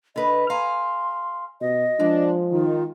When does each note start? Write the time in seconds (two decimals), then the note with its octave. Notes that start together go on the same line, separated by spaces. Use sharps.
0.16 D3 B4 D#5
0.50 F5 G#5 A#5 C6
1.61 B2 D#5
1.99 F3 G#3 D4
2.52 D#3 F4